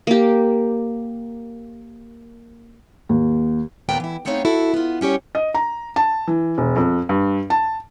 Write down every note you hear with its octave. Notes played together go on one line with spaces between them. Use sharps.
A#3 G4
D#2
D#2 A#2 B3 A#4 G5 A#5
E3 E4
A3 B3 C4 D#4 C#5 F5
E4 F#4 A4
B3 F4
G3 C#4 G4 C#5
D#5
A#5
A5
E3
E1
F2
G2
A5